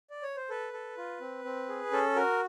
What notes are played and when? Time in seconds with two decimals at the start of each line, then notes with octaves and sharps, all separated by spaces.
0.10 D5
0.23 C#5
0.36 C5
0.50 A4 B4
0.73 A4
0.97 F4
1.20 C4
1.45 C4
1.69 G#4
1.92 C#4 A4
2.16 F#4 A#4